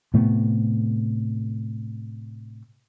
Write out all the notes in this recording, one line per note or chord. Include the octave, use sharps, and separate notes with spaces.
A2 C3 A3 B3